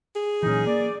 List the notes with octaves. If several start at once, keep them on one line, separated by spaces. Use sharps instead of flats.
G#4
A#2 E3 F#3 C#4 D#4
A#3 D5